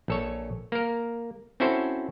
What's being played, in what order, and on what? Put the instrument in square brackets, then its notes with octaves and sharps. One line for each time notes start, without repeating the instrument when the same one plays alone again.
[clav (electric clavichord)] A#1 A4 C#5
A#3 A#4
C4 C#4 E4 F#4 A4 C5